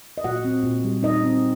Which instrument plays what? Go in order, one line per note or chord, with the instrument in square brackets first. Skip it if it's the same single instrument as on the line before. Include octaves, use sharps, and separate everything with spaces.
[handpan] D#5
A#2 F#4 F#5
C4
A#2
G3
A#2 D#4 D#5
C4